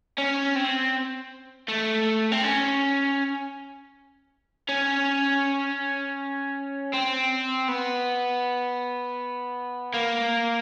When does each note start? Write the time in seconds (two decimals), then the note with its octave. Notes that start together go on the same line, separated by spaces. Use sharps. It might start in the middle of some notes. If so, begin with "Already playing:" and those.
0.18 C#4
0.56 C4
1.68 A3
2.32 C4
2.44 C#4
4.69 C#4
6.94 C4
7.69 B3
9.94 A#3